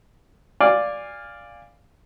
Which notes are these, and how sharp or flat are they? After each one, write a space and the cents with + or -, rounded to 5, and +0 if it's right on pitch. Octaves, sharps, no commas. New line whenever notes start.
D5 +0 F5 +0 G#5 -25